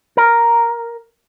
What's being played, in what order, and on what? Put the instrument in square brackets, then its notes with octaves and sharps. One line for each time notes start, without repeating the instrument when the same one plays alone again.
[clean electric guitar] A#4